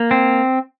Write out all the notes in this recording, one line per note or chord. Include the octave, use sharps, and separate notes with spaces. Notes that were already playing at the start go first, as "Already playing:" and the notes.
Already playing: A#3
C4